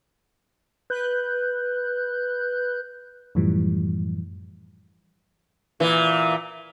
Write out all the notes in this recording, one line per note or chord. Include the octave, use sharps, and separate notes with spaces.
B4 F#6 G6
F#2 A2 E3 F3 G3
A#2 E3